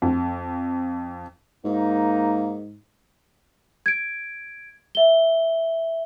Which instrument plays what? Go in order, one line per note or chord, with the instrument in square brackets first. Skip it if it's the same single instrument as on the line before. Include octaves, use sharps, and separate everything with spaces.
[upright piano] F2
[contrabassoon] G#2 [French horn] A#3 [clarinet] D#4
[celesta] G#6 D7
E5 G7